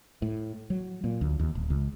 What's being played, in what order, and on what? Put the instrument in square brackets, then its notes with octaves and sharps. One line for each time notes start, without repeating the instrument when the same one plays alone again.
[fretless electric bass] A2
F#3
A#2
D2
D#2
D1
C#2